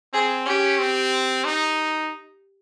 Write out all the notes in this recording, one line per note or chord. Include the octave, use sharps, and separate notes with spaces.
C4 G#4
C#4 G4
C4
D#4